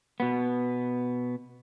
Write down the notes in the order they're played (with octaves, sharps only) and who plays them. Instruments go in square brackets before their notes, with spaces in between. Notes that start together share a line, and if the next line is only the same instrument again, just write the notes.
[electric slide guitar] B2 B3